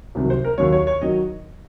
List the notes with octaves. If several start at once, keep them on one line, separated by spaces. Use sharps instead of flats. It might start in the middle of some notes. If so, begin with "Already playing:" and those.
C2 C3 D#3 F#3
C5
A#4
D#2 D#3 F#3 C#5
C#5
C#5
D#3 F#3 D#5